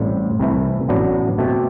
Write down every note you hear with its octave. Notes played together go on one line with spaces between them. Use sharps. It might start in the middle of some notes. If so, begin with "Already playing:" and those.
Already playing: A1 A2 G3 C4
C2 C3 E3 A3 E4
A1 A2 F#3 B3 D4
B2 A3 C4 G4